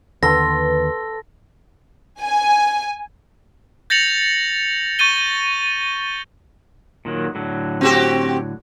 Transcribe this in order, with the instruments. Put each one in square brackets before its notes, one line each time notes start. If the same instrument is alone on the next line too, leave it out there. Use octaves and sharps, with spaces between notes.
[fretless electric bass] D#2 D3 [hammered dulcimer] A4 C6 [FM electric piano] B4 [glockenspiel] A#6
[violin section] G#5
[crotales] G6 A6 A#6 C#7 F7 F#7
C#6 G6 A6 D#7 G7
[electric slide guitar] A#2 D#3 F#3
A2 D3 F#3
[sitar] C4 F#4 G4